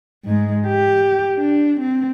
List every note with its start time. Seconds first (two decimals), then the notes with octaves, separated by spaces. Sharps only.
0.24 G#2 G#3
0.67 G4
1.37 D4
1.80 C4